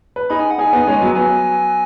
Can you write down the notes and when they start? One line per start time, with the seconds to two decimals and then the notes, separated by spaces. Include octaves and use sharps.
0.16 B4
0.30 D#4 G#4 B5
0.40 G#5
0.51 F#5
0.58 D#4 G#4 G#5
0.73 B3 D#4
0.87 G#3 C#4
1.01 F#3 B3
1.15 F#3 B3 G#5